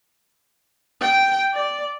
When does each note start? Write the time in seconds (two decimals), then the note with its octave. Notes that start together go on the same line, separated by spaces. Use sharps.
1.01 G5
1.54 D5